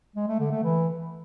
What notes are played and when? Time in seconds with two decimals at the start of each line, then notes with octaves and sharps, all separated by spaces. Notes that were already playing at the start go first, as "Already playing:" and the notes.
0.16 G#3
0.28 A3
0.40 D3
0.52 A3
0.63 E3